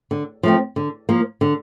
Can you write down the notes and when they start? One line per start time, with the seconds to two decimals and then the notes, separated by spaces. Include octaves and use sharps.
0.11 D3
0.43 F3 A3 C4
0.76 D3
1.09 F3 A#3
1.41 D3